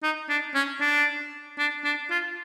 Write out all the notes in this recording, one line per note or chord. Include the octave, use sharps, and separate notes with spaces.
D#4
D4
C#4
D4
D4
D4
F4